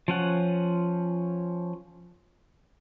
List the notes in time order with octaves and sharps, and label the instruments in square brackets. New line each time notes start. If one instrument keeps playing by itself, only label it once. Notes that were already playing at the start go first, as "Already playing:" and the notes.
[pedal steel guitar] F3 C#4 F#5